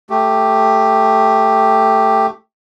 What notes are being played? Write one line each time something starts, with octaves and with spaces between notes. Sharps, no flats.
A3 G4